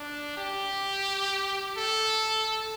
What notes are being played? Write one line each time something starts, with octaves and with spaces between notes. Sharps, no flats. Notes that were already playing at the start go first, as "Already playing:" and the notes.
Already playing: D4
G4
A4